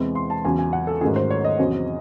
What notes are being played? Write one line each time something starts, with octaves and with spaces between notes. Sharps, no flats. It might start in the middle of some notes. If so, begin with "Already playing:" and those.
Already playing: E2 C3 E3 G#3 C4
C6
A5
E2 C#3 F#3 C#4 G#5
G#5
F#5
A4
G#2 D#3 F#3 A3 C#4 G#4
C5
C#5
D#5
E2 C3 F#3 C#4